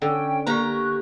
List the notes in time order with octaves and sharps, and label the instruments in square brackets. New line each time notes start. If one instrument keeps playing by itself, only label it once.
[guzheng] D3 [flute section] C#4 G5
[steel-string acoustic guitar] A#3 G4 A#5 [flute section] C#6 F#6